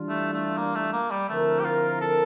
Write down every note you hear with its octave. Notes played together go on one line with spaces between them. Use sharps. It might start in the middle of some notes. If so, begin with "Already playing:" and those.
Already playing: E3 G3 D4 F4
A3
A3
A#3
A3
A#3
G3
D3 F3 A3 C4 E4 A#4
G4
F4
A4